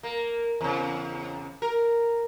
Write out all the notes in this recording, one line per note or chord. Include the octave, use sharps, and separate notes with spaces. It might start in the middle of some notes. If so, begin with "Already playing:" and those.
A#3
E2 C#3
A#4